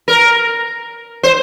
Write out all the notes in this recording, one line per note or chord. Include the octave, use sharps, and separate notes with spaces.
A#4
C5